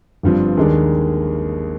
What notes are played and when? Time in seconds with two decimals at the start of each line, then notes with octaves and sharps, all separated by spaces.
0.23 G1 G2 F3 C4
0.57 D#2 D#3 G#3 D4